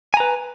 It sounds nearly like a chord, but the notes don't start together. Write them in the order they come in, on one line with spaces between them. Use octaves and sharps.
G#5 A#5 B4